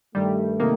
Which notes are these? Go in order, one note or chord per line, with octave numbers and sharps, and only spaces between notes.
G2 D#3 G3 A3
C3 D#3 A#3 D#4